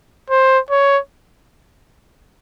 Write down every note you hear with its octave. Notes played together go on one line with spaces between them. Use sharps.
C5
C#5